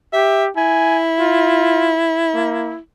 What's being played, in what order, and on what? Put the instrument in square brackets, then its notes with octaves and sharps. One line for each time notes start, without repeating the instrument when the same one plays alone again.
[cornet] G4 [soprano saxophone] E5
[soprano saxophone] E4 [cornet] G#5
[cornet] F4
A#3